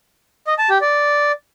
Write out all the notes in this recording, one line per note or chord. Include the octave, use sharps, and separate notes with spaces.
D#5
A5
G4
D5